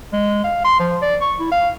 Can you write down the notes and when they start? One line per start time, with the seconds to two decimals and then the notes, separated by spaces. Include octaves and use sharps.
0.13 G#3
0.44 F5
0.64 C6
0.80 F3
1.02 D5
1.21 C#6
1.40 E4
1.52 F5